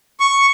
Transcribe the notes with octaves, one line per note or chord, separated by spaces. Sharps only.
C#6